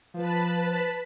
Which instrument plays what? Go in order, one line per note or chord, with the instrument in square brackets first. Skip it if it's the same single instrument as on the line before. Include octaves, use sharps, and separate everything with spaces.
[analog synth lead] F3 [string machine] B4 A5 B5